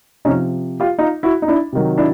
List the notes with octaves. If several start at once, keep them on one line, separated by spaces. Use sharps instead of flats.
C3 F3 C#4 D#4
F4 G4
D#4 F4
E4 F#4
D#4
D4 E4
C3 D#3 F#3
D4 E4